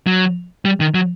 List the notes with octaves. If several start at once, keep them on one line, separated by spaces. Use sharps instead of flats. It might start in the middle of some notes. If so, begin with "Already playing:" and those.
F#3
G3
D#3
F#3